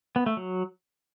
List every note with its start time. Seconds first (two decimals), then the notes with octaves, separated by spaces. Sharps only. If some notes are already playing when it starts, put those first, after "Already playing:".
0.16 B3
0.26 A3
0.37 F#3